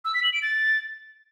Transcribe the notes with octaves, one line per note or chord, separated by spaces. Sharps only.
E6
B6
F#7
D7
A6